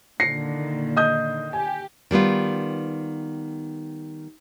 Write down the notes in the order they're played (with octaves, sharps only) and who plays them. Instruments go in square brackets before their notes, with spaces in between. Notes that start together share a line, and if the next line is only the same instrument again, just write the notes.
[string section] A#2 D3 D#3 [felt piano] A#6 C7 C#7
[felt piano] D#5 D#6 G6
[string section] G4 [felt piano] G#5
[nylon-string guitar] D#3 G3 B3 F4